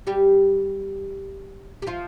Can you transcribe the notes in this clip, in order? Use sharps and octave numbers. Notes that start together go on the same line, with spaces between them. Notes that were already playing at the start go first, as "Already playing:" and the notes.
G3 G4
G4
F3 F4